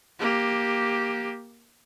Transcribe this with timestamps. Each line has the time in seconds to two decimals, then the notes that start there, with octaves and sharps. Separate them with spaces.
0.20 A#3 G4